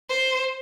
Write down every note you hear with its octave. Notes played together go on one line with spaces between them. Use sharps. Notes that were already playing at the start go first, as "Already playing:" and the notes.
C5